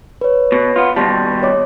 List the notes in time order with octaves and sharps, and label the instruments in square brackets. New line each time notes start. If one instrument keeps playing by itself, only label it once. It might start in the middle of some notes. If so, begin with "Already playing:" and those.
[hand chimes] B4 C#5
[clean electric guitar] B2
B3 F4
[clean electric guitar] D#2 B2 G3 [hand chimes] A5 C6 A#6
[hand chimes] C#5 D#5 D6